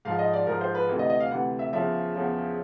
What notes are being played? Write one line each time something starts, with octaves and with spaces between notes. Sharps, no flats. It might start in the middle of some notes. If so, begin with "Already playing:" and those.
G#2 F3 F5
D#5
D5
G#2 F3 A#4
C5
B4
D2 C3 E3 A4
D#5
D#5
F5
D2 C3 E3 F#5
E5
E2 C#3 F3 E5
E2 C#3 F3